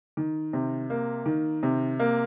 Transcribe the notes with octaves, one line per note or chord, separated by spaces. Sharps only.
D#3
C3
A#3
D#3
C3
A#3